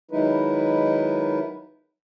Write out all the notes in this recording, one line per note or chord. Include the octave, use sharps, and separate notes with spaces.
D#3 F#3 G#3 D#4 E4 B4